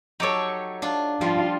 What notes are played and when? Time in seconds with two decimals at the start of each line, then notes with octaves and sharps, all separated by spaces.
0.20 F#3 D#4 G4 A4 C#5
0.82 D4 F4
1.21 F3 G3 F4